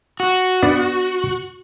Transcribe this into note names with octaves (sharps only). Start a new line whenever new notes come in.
F#4
B3 D4